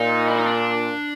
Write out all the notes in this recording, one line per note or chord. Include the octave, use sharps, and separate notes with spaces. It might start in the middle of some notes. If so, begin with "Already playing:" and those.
Already playing: A#2 D#4
E4
D#4
D4